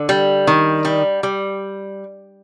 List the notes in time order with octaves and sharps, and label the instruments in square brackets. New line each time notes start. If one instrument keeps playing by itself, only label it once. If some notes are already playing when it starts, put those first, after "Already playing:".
Already playing: [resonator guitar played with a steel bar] D3
G3
D#3
G3
G3